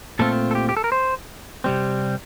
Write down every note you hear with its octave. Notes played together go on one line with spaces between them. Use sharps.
A#2 A3 C4 F4 A4
A4
G4
G4
A4
A#4
C5
C3 G3 C4